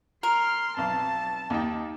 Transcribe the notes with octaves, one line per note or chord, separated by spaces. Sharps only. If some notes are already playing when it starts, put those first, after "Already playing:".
A#4 C6 F6
B1 F2 A5
D#2 D#4 G5